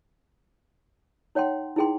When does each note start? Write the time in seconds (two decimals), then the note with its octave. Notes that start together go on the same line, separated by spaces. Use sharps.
1.35 D#4 C#5 F#5 G5 C6
1.76 D#4 E4 G#4 G5 C6